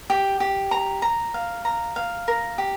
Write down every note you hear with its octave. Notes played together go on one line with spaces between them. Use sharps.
G4
G4
A#5
A#5
F5
A#5
F5
A#4
G4